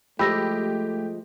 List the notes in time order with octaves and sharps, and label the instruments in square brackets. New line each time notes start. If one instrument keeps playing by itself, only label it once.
[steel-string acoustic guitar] F3 G#3 [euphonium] A3 [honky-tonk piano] G4 [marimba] B5 E6 A#6